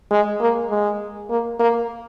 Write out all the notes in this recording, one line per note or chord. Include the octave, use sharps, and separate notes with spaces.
G#3
A#3
G#3
A#3
A#3